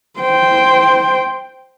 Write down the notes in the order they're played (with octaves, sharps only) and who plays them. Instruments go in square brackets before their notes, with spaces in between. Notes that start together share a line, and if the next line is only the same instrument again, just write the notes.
[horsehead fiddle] C5 G5